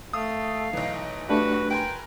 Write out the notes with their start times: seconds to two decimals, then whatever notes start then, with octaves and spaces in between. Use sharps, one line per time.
0.13 A3 F5 D#6
0.73 B1 E3 D#4
1.29 A3 D4 F#4 G4 B4
1.70 A#4 B4 G5 G#5 C6